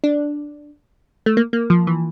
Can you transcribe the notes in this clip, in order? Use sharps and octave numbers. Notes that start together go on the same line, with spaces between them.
D4
A3
A#3
A#3
F3
E3